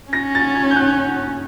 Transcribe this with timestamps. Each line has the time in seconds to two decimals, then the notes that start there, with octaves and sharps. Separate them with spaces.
0.13 C#4 A#6
0.35 A6
0.55 G#6
0.71 G6
0.76 F#6